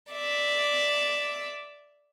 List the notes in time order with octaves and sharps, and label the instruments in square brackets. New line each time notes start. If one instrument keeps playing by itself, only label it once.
[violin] D5 E5